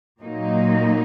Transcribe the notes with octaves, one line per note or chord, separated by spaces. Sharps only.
A#2 F#3 A#3 D#4